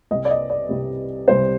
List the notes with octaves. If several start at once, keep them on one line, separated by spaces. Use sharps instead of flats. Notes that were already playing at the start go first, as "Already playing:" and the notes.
C2 C3 G3 D#5
D5
D#5
D5
C2 C3 G3
C2 C3 G3 C5